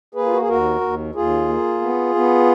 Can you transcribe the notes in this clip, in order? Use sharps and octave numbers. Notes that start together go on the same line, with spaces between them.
A#3 G#4 B4
F4
F#4
G#4
D#2 F#4 A#4
D#2
D#2 F4 G#4
A#3
B3
B3